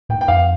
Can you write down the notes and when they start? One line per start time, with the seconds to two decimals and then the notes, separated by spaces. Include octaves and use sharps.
0.09 A2 G5
0.21 G5
0.28 F2 F5